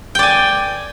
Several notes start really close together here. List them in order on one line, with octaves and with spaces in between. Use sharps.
G5 D5 G#5